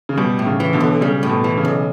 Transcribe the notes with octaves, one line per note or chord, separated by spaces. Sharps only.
C#3
B2 G3
A2
C#3
E3
B2 D3
B1
C#3 G3
A2
B2
E3
C#3
B1